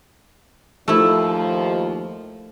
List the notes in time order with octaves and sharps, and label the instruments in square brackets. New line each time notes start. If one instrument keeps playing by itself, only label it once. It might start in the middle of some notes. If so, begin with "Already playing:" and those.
[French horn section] D#2 F3 [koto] A3 E4